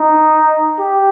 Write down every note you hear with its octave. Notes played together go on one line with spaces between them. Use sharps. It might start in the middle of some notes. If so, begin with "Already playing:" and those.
Already playing: D#4
G4